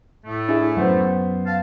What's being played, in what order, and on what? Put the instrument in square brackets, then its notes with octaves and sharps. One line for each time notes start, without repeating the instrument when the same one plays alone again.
[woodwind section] A2 A3
[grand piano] D4 E4 G#4
[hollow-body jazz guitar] F#2 [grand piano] B3 C5
[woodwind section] F5 A5